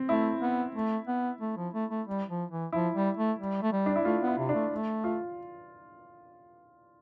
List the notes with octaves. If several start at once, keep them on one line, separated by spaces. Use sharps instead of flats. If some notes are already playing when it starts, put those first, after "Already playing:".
Already playing: C4
A3 E4
B3
A3
B3
A3
F3
A3
A3
G3
F3
E3
F3 E4
G3
A3
G3
A3
G3
D4
E4
A3 F4
B3
E4
C3
D4
A3
A3
F4